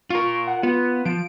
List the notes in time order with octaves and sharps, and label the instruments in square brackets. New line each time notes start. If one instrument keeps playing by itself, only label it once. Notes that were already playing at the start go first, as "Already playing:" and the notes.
[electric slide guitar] F4 A#4 [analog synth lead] C#6
[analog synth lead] F#5
[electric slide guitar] B3 [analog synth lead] F4
[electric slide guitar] F3 [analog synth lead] D7